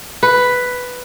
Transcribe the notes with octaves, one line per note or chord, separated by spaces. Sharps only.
B4